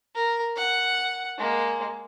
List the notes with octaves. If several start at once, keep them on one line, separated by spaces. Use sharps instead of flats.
A#4
F#5
G#3 A#3